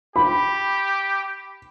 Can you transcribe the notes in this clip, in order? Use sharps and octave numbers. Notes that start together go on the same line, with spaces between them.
G4 B5